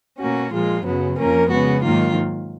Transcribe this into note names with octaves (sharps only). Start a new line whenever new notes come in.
B2 A#3 C#4 F#4
A#2 F3 G#3 F4
F#2 C#3 F#3 B3
F2 F3 A#3 C#4 A#4
C#3 G#3 B3 F#4
G#2 D#3 F#3 A#3 F4